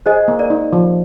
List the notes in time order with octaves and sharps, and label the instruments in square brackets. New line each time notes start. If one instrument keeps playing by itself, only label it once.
[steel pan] G#4 [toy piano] C5 D#5
[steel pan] A#3
[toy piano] A#4 D5
[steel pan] D#4
F3